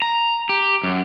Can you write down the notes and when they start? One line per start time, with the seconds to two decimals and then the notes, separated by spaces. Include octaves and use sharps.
0.02 A#5
0.49 G4
0.84 F#2